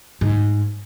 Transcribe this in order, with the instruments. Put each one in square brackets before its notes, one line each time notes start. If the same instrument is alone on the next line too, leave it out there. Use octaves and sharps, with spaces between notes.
[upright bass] G#2